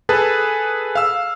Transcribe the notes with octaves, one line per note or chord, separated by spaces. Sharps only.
G#4 A4 B4 A5
F5 E6